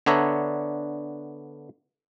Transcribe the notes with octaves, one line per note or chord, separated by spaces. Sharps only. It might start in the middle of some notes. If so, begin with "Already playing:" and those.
D3 B3 D4 C#5 E5 A#5